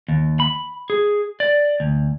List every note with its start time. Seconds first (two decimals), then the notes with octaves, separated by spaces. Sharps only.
0.08 D#2
0.40 B5
0.90 G#4
1.40 D5
1.80 D2